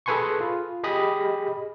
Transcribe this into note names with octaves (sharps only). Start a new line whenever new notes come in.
G#4 A4 B4 G#5 C6 C#6
F4
G4 G#4 D#5 B5 D#6